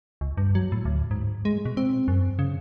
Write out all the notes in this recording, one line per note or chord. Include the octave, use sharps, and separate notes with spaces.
C#2
G2
F#3
A2
D2
G#2
G#3
B2
C4
F#2
C#3